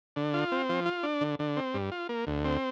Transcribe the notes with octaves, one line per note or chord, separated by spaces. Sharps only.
D3
F4
C4
F3
F4
D4
D3
D3
C4
G2
F4
A#3
D2
C4